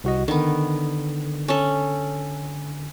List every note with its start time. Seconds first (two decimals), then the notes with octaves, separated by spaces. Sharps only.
0.04 C2 F#4 D#5
0.28 D3 D#3 B3
1.48 C#4 A4